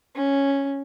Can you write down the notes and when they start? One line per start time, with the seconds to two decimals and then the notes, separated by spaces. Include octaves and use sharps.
0.15 C#4